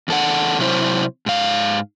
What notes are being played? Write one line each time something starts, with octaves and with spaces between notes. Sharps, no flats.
E2 A4 F#5
C3 F#3 E4 C5
G#2 F5